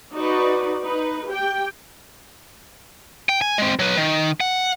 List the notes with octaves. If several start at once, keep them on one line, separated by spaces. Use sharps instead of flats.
D#4 F#4 B4 D5
D#4 B4
G4 G5
G5
G#5
G#3 C4
F#3 B4
D#3
F#5